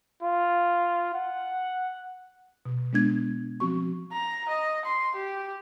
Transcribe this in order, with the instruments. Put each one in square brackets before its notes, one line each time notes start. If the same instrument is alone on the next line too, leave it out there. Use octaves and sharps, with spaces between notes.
[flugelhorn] F4
F#5
[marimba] B2
G#3 B3 D4 G#6
F3 C4 F#4 C#6
[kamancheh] A#5
D#5
C6
G4